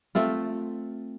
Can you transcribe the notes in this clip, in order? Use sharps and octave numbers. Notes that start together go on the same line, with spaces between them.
A3 C4 F4